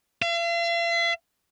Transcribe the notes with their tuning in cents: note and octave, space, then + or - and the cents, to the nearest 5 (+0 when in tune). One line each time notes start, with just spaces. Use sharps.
F5 -45